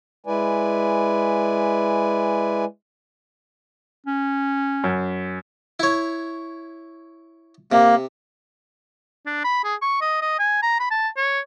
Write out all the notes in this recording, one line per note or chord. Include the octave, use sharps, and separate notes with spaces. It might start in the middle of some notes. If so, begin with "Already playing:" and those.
G#3 E4 B4 D5 G#5
C#4
F#2
E4 C#5
C3 A#3
D4
B5
G#4
C#6
D#5
D#5
G#5
A#5
B5
A5
C#5